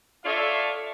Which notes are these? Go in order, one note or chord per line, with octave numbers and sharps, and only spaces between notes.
F4 A4 C#5 D5 E5 F5